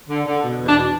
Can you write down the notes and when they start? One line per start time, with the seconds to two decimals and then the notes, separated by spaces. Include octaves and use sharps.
0.08 D3
0.25 D3
0.42 B2
0.58 E2
0.67 D4
0.75 B2